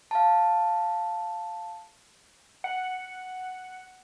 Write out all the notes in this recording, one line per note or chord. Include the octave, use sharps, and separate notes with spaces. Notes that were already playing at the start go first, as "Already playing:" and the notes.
F5 A5
F#5